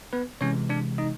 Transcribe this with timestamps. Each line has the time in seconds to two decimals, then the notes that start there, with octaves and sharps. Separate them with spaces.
0.13 B3 B4
0.41 C3 E3 G#3 C#4 C#5
0.69 D4 D5
0.98 D#4 D#5